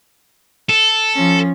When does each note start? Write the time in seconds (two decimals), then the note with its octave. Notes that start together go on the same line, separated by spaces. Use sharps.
0.69 A4
1.14 F3 C#4